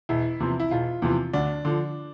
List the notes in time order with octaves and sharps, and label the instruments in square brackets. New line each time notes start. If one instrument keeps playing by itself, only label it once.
[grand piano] E1 E4
E2 C3 F3
E4
E1 F4
E2 C3 F3
D2 D4
D3 F3